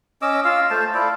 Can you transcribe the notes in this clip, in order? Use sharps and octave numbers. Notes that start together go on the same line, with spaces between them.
C#4 D#5 D6 E6
F4 F5 E6
A3 C5 A5
E4 F4 A4 D5